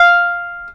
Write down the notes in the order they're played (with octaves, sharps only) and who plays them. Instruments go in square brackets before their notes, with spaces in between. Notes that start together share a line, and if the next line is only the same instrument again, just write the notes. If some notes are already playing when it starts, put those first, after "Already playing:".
Already playing: [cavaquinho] F5